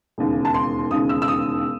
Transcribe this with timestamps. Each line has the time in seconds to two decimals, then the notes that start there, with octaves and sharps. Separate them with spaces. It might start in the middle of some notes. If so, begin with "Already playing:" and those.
0.18 E1 D#2 C#3
0.45 A5
0.54 C6
0.91 E1 D#2 C#3 D#6
1.09 E6
1.22 E6
1.28 D#6